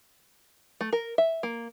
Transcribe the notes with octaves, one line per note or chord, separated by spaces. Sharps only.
A3
A#4
E5
A#3